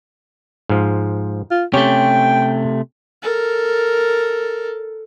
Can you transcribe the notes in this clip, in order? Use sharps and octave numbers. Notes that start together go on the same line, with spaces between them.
G#2 F3
F4
C3 A3 C#4 G4 C#5 G5
A4 A#4